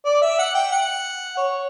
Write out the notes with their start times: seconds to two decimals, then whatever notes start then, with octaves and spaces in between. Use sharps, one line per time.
0.05 D5
0.22 E5
0.39 F#5
0.55 G5
0.71 F#5
1.37 C#5